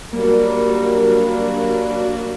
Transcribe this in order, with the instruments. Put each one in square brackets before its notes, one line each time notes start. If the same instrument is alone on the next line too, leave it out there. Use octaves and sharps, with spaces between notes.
[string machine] F#3 D4 F#4 [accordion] G3 [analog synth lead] A#3 [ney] A#4